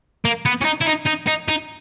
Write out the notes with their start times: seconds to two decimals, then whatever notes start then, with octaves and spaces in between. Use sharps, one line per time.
0.25 A#3
0.46 B3
0.62 C#4
0.65 D#4
0.82 E4
0.86 D#4
1.06 D#4
1.27 D#4
1.49 D#4